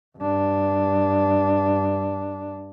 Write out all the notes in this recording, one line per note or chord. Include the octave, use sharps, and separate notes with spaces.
G2 D4